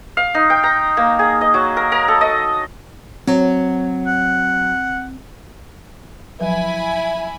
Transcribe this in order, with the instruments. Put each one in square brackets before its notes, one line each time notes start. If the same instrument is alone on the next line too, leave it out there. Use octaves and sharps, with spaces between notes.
[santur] F5
D#4
G5
A#5
A#3
G#4
D#5
F#3
A#4
A#4
A4
D#5
[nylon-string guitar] F#3 [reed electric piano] C4
[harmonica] F#5
[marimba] F3 F#3 B4 [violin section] E4 G#5 B5 [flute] E5